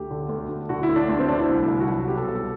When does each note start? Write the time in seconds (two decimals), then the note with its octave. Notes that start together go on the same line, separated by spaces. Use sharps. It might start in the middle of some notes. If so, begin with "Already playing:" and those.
Already playing: D2 G4
0.10 D3
0.29 D2
0.49 D2
0.69 D3 F#4
0.83 E4
0.89 D2
0.96 D4
1.09 D2
1.19 C4
1.29 D3 D4
1.39 E4
1.49 C2
1.68 C2
1.80 F#4
1.88 F#3 E4
1.98 F#4
2.08 B2 G4
2.17 A4
2.28 C2 A4